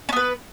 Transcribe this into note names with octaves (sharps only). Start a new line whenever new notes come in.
B3 C#4 B4